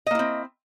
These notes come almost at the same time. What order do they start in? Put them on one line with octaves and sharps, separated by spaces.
D#5 A#3 E4 C4